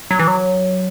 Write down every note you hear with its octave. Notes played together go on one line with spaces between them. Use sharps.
F#3
E3
F#3